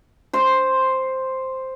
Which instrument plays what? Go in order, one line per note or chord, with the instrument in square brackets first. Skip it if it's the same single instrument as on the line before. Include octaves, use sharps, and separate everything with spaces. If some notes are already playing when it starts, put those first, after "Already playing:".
[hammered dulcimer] C5 C6